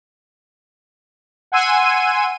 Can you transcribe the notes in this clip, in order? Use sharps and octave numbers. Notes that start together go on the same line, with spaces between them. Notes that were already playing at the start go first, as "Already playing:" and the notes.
F#5 G#5 C6 E6 D#7